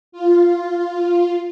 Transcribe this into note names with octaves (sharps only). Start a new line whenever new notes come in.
F4